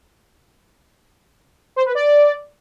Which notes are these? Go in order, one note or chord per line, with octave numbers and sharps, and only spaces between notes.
C5
B4
D5